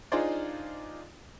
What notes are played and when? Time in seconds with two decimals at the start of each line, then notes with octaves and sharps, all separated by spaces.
0.12 D4 D#4 F4 G#4 C5 D5